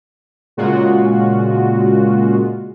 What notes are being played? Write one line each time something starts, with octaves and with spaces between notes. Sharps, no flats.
A#2 C#3 G#3 F4 F#4